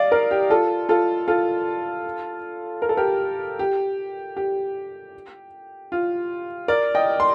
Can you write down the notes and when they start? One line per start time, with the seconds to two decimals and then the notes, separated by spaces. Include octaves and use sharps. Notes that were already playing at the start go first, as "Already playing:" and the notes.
Already playing: D5 D#5 F5
0.12 A#4 D5
0.31 G4
0.50 F4 A4
0.89 F4 A4
1.28 F4 A4
2.82 A#4
2.89 A4
2.97 G4 A#4
3.59 G4
4.37 G4
5.92 F4
6.68 A#4 D5
6.95 D#5 G5
7.20 C6